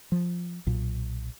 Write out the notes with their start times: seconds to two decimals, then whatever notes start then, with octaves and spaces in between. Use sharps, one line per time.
0.12 F3
0.67 B1 A#2